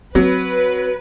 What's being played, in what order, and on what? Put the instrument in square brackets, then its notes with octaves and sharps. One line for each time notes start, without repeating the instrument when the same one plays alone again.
[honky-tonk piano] F#3 [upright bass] C4 [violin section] B4